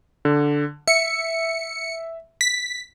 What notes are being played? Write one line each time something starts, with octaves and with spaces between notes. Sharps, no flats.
D3
E5 C#7
B6